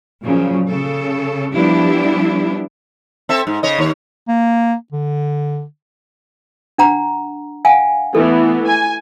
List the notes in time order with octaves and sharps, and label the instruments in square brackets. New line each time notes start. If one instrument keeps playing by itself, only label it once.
[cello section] A#2 C#3 F3 F#3
C#3 A4
F3 G3 B3 D4 E4 G4
[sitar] C4 A4 E5
G#2
C#3 C#5 D#5
D#2 C#5
[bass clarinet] A#3
D3
[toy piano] D4 F#5 A#5
F5 F#5 G#5
[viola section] E3 A3 B3 [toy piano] A4
[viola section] G#5